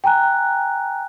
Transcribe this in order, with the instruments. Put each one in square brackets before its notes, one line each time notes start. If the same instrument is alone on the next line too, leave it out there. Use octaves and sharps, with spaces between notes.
[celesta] G5 G#5 A#5 F#6